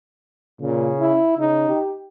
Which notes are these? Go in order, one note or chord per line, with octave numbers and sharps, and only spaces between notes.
A#2 C#3
E4
C#3 D#4
G4